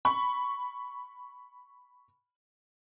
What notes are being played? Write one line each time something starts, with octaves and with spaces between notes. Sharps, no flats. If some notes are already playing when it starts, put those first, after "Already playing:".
B5 C#6